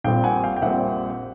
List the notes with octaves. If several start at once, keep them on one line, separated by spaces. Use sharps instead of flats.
A#1 A#2 G3 C4 F5 G5
F#5 G#5
F5 G5
G5
A#1 A#2 G3 C4 E5 F#5